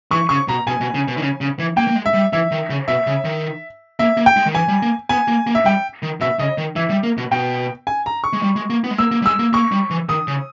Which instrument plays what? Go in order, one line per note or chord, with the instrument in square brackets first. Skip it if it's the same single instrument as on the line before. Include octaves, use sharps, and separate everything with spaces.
[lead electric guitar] E3 [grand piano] C#6
[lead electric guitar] C#3 [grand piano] C#6
[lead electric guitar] B2 [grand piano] A#5
[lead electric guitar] B2 [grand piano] G#5
[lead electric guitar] B2
C#3
B2
D#3
C#3
C#3
E3
[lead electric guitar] A#3 [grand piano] G5
[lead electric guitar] A#3
G#3
[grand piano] E5
[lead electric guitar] G3
[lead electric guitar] E3 [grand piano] E5
[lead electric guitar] D#3
C#3
[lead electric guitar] B2 [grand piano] E5
[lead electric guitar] C#3
D#3
[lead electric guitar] A#3 [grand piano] E5
[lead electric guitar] A#3
[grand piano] G5
[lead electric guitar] G#3
D#3
[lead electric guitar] E3 [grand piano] G#5
[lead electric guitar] G3
A#3
[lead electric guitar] B3 [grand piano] G#5
[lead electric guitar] A#3
A#3
[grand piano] E5
[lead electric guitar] G3 [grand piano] G5
[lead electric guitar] D#3
[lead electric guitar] B2 [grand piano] E5
[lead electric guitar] C#3 [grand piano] D#5
[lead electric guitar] D#3
[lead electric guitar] E3 [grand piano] E5
[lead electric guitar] G3
A#3
B2
[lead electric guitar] B2 [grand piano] G5
[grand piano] G#5
A#5
C#6
[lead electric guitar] G#3
G3
G#3
A#3
B3
G#3
[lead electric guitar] A#3 [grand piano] E6
[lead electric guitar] A#3
G3
[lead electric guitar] G#3 [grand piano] E6
[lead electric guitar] A#3
[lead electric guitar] A#3 [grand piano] C#6
[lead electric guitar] G3
E3
[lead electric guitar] D#3 [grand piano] D#6
[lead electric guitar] C#3